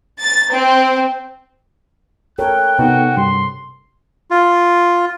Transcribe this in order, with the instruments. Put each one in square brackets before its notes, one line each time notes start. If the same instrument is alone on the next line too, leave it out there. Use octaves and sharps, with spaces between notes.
[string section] A6
C4
[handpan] A4 A#4 C#5 [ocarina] G5 [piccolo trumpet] F#6
[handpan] C3 [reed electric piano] B3 D#4 A4 [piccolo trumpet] F#4
[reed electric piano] G2 [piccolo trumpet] C6
[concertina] F4